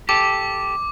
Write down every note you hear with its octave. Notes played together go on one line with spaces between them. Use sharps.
G4 A4 D6